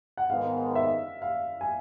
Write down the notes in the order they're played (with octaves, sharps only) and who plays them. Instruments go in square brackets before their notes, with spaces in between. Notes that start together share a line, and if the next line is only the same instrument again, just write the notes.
[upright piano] F#5
[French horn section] G#2 D#3 G#3 B3 D#4 [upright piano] F5
[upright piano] E5
F5
G#5